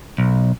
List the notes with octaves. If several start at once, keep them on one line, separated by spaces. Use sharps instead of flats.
B1